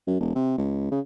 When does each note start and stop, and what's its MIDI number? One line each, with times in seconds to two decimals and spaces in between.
0.07 0.15 42
0.20 0.34 28
0.35 0.57 48
0.58 0.89 37
0.91 1.00 49